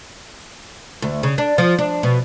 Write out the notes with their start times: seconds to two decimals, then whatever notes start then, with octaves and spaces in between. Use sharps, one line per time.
1.02 D2
1.23 C#3
1.38 D4
1.58 F3
1.79 D4
2.03 B2